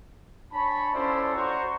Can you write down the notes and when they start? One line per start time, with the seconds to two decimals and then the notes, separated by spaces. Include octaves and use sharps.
0.53 D4 C#5 G#5 A5 B5
0.94 C#4 E4 F4 A4 C5 D5
1.34 F#4 C5 A#5 C6 C#6